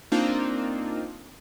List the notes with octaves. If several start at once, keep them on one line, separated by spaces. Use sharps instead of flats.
A#3 C4 D4 D#4 F4